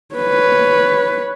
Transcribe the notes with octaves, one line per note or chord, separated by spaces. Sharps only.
B4 C#5